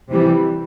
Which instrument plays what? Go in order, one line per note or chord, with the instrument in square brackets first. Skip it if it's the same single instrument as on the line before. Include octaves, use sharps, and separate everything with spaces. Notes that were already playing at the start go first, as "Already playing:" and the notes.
[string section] C3 E3 G3